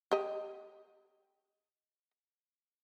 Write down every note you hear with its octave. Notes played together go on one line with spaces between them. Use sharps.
G4 D#5